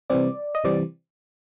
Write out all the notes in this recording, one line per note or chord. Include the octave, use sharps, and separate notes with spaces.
C3 E3 G3 C4 D5
D#5
C3 E3 G3 C4 D5